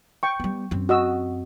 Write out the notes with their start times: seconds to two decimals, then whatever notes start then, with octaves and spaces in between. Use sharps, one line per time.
0.23 G5 C#6
0.40 G3 B3
0.71 F#2 C4
0.89 F#4 D#5 E6